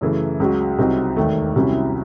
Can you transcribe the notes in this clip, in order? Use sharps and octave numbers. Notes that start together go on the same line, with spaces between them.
F#2 C#3 E3 A3
C#2 C#3 F#3
C2 C3 F#3 C4 D#4
E1 D#2 D#3 A3
C2 C3 F#3 C#4 E4